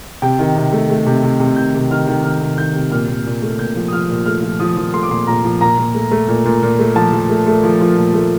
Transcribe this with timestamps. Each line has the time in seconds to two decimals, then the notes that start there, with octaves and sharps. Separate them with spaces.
0.22 C3 G5
0.39 D#3
0.56 C3
0.72 A3
0.90 A3
1.06 C3
1.23 C3
1.40 C3
1.56 D#3 G6
1.74 C3
1.91 D#3 F6
2.07 D#3
2.24 D#3 F6
2.41 C3
2.58 D#3 G6
2.75 C3
2.92 A#2 F6
3.09 A#2
3.25 A#2
3.42 A3
3.59 A#2 G6
3.75 F3
3.88 D#6
3.93 F3 F6
4.09 A#2
4.26 A3 F6
4.43 F3
4.60 F3 D#6
4.77 F3
4.94 A3 C6
5.03 D6
5.10 A#2 C6
5.27 A#2 A#5
5.44 F3
5.61 A#2 A#5
5.78 A#2
5.95 A3
6.11 A3
6.28 A#2
6.45 A#2
6.62 A#2
6.79 A3
6.96 F3 A5
7.13 F3
7.30 A3
7.47 A3
7.63 F3
7.81 F3
7.97 A#2
8.14 A3